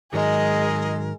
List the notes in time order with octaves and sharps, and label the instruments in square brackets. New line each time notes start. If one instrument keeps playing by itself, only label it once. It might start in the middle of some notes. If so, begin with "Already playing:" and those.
[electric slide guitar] G#2 D#3 F#3 [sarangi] G#3 [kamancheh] G#4 D#5 [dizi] A#4